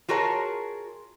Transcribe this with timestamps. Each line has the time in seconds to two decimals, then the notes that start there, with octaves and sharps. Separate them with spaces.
0.08 F4 F#4 G#4 A#4 C#5 A5